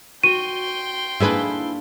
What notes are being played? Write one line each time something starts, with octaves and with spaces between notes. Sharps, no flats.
F#4 G5 C6 D#7
A#3 D4 E4 G#4 B4